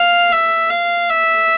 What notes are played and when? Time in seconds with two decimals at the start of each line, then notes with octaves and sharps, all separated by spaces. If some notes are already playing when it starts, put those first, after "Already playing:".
Already playing: F5
0.32 E5
0.70 F5
1.09 E5